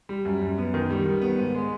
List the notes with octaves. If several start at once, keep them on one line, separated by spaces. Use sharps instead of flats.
G3
F#2
F#2
B3
D#3
G3
D#3
B3
G#2
G#3